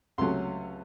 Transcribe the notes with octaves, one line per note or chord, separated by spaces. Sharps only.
C#2 C3 F#3 A3 C#4 C6